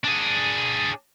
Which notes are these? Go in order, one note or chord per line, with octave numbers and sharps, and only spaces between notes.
D4 G#4